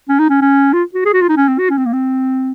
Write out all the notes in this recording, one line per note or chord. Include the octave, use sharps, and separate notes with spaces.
C#4
D#4
C#4
C#4
F4
F#4
G#4
F#4
F4
D#4
C#4
C4
F#4
C#4
C4
A#3
C4